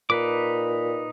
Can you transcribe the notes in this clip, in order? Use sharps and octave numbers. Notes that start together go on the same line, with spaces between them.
A#2 D#4 B4 D6